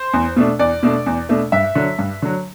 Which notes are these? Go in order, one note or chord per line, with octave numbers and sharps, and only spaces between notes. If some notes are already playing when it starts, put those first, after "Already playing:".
Already playing: C5
E2
B2 A3 D4
E2 D5
B2 A3 D4
E2
B2 A3 D4
G2 E5
D3 F#3
G2
D3 F#3